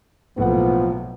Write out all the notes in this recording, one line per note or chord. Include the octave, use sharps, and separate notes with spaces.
B1 A2 F3 A#3 B3 F#5